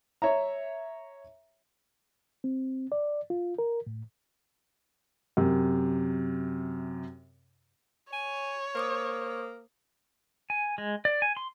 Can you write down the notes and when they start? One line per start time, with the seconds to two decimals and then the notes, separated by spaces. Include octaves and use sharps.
0.22 C#5 E5 A#5
2.44 C4
2.92 D5
3.30 F4
3.59 A#4
3.87 A2
5.37 F#2 C3
8.13 C#5 G#5
8.75 A#3 C5 D6 D#6
10.50 G#5
10.78 G#3
11.05 D5
11.22 G#5
11.37 C6